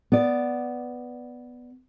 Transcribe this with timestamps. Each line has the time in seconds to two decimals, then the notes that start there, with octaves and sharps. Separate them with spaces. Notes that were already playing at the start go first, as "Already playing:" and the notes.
0.12 B3 D5